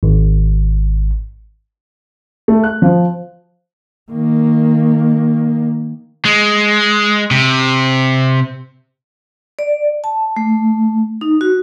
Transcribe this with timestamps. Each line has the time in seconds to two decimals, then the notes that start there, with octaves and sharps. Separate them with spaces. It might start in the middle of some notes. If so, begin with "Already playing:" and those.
0.03 G#1
2.48 A3
2.64 F#6
2.82 F3
4.11 D#3 A#3
6.25 G#3
7.31 C3
9.59 D5
10.04 A5
10.36 A3
11.21 D#4
11.41 F#4